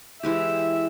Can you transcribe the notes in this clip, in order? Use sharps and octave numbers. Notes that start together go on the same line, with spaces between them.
E3 G#3 G4 E5